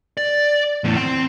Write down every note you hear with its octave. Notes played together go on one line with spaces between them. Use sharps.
D5
E2 A2
C4 G5